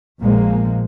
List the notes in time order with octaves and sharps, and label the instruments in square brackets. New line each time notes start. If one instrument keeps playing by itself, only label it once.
[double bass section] A#1 A#2 F3 G#3 A#3